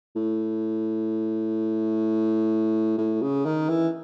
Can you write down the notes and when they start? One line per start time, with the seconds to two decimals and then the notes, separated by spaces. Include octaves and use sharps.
0.16 A2
2.98 A2
3.22 C#3
3.45 D#3
3.69 E3